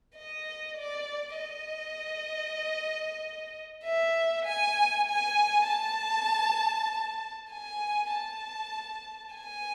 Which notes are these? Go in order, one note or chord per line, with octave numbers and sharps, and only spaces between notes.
D#5
D5
D#5
E5
G#5
G#5
A5
G#5
A5
G#5